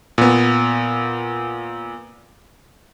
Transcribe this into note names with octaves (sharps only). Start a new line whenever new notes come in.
A#2 B3